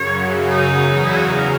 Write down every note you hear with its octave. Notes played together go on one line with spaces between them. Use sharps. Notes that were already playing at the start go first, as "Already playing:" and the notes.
Already playing: F#2 C#3 F#3 C#5
D#4
E2 C#3 F#3
E4
F#4
D#4
A#4